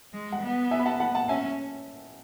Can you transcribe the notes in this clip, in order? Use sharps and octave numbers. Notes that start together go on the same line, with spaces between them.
G#3
F#5
B3
E5 G#5
B5
F#5 A5
F#5 A5
F#5 A5
C#4 E5 G#5